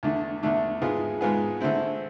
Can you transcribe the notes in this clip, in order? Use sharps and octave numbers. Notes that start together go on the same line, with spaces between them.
E2 D3 A3 D4
E2 D3 A3 D4
G#2 G#3 B3 F4 G#4
G#2 G#3 B3 F4 G#4
D3 A3 C4 E4